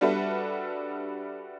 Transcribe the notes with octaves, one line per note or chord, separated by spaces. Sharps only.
G3 D4 F#4 A4 B4 E5